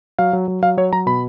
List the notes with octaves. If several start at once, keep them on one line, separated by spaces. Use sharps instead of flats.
F#3 F5
F#3
F#3
F#3 F5
F#3 C#5
F#3 A#5
B2 B5